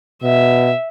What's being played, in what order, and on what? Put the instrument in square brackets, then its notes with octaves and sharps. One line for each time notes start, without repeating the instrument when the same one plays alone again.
[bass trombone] B2 [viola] E5